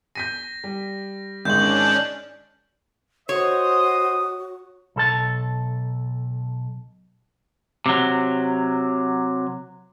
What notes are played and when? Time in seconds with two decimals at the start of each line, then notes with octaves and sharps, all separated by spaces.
0.15 G6 A#6 B6 D#7
0.64 G3
1.45 G#1 G#3 C#4 D4 C#6 G6 F#7
3.29 F#4 C5 C#5 D#5 D#6
4.96 B1 A4 A5
7.86 C3 F#3